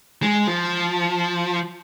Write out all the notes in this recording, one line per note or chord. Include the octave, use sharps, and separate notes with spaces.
G#3
F3